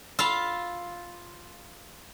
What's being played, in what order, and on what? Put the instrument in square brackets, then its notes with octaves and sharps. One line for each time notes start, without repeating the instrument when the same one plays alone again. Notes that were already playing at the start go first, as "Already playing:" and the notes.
[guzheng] F4 F5 [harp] B5 E6